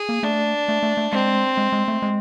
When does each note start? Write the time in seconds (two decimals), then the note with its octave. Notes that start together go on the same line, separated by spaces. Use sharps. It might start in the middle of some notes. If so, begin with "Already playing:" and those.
Already playing: G#4
0.09 A#3
0.23 A3 D4
0.68 A3
0.83 A3
0.97 A3
1.12 G#3 C4
1.57 G#3
1.72 G#3
1.88 A3
2.02 G#3